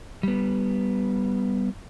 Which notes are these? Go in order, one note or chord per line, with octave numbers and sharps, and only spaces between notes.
G3 B3